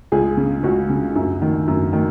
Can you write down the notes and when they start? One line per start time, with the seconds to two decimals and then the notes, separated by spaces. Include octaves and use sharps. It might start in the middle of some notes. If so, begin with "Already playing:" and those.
0.12 C#2 G#4
0.37 C#3
0.63 C#2 F#4
0.90 C#3
1.15 F#2
1.42 D#3
1.68 F#2
1.93 D#3